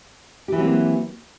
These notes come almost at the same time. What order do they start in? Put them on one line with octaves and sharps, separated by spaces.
G4 E3 F#3 C4 A#3